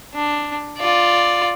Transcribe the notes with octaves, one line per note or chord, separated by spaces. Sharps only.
D4
F4 D5